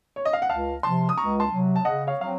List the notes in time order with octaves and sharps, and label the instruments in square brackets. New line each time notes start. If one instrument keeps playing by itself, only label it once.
[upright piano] C#5
D#5
F5
F#5
[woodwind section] C#2 [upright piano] F5 A5
[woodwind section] C3 F3 [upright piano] A5 C6
[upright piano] D#6
[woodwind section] C#2 [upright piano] A#5 C#6
[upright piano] A5 C6
[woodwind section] C3 F#3
[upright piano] A5
[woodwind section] C#3 [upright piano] D#5 F#5
[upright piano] C#5 F5
[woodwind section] F#3 C4 [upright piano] F5